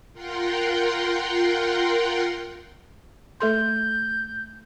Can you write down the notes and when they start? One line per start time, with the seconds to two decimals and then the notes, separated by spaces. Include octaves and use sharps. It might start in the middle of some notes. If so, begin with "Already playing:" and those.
0.13 F4 A#4 F#5 G5 C6
3.40 A3 A4 C6 G6